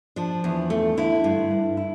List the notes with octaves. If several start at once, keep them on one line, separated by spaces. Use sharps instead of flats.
F3 D4
E2
A3
D3 E4
G2
G2
E4